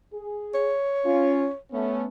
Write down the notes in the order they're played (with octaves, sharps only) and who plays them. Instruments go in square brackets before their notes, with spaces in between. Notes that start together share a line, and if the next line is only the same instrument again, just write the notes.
[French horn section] G#4
[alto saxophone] C#5
[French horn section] C#4 F4
A3 B3 C#4